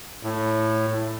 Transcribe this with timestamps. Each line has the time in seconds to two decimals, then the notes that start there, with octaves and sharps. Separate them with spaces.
0.23 A2